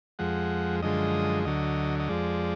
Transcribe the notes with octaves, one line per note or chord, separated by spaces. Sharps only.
F2 F3 G#3 F#5
F#2 D3 F3 G#3 D#5
D2 D3 F#3 D#5
D#5
F2 F3 G#3 D5